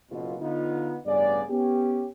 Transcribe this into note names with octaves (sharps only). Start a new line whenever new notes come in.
F#1 B2 F4 F#4
D3 B3 D#4 F4
A1 G2 C#3 B3 G#4 D5
B3 C#4 G4